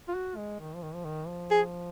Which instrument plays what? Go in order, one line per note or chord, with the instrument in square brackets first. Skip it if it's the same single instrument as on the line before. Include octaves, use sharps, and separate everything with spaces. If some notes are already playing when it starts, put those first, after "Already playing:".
[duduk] F4
F#4
G#3
D#3
F3
D#3
F3
D#3
F3
[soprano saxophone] G#4